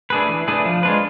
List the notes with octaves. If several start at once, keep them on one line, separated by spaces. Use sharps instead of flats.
A3 D4 G#4 B4
E3
A3 D4 G#4 B4
F3
G#3 D4 F4 B4